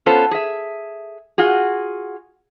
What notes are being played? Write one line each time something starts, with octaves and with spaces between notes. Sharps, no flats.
B3 C#4 F4 A4 C5
G#4 E5
F4 F#4 G#4